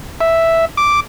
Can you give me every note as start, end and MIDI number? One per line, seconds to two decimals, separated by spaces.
0.21 0.65 76
0.77 1.00 86